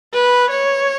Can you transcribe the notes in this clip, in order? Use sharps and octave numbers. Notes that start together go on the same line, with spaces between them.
B4
C#5